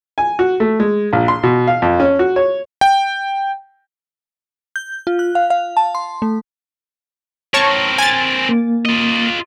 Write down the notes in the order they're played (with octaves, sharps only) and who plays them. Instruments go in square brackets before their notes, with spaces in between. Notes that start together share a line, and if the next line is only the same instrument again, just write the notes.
[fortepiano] G#5
F#4
A3
G#3
A#1
C6
B2
F5
F2
C#4
F#4
C#5
[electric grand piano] G5
[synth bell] G6
F4
F#6
F5
F5
A5
C6
A3
[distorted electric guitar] C4 A#4 [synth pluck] C#5 A5 C#6
[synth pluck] G#5 A6
[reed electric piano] A#3
[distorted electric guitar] F4 D#5